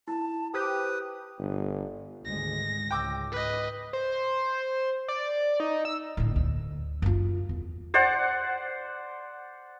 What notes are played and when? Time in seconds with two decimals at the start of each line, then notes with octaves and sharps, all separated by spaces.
0.08 E4 A5
0.54 G4 B4 C5 D#6
1.39 G1
2.25 G#1 D2 G#3 A#6
2.91 C#2 G#2 G5 D6 E6
3.32 B4 D#5
3.93 C5
5.08 D5
5.60 D#4
5.85 E6
6.17 A2 D3
6.36 D2
7.02 F#2 F4
7.49 E2
7.94 C5 D5 F#5